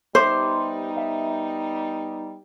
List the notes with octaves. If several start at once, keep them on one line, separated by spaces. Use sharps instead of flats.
G3 B3 D#4 G4 C5 E5 C6
E5